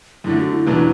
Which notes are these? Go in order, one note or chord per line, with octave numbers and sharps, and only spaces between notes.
F#2 D3 A3 E4
F#4
E4
E2 B2 F#3 B3 D4